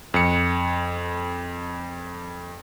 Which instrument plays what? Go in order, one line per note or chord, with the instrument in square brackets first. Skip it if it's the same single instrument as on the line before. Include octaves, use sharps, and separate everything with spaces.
[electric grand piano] F2 C#7